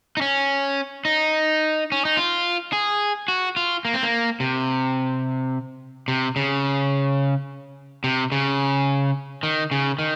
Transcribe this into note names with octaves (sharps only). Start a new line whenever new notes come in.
D#4
C#4
D#4
C#4
D#4
F4
G#4
F#4
F4
A#3
C4
A#3
C3
C3
C#3
C3
C#3
D#3
C#3
D#3